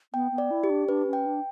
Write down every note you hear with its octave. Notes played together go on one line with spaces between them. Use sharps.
B3 G5
B3
D5
E4
G4
D4
D4 B4
C#4
G5
D4